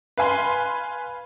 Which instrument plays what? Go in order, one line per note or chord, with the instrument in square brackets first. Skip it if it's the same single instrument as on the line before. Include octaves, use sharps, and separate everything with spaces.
[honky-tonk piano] B4 F5 G#5 B5 C6